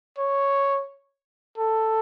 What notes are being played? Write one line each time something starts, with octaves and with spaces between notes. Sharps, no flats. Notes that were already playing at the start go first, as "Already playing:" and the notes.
C#5
A4